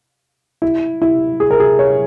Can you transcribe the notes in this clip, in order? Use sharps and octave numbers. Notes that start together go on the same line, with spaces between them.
E4
E4
G#4
A#4
G#4
C#5